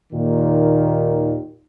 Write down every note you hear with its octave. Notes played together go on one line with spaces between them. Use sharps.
D#2 A#2 D#3